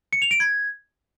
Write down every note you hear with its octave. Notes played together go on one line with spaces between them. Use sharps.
C#7
F7
D7
G#6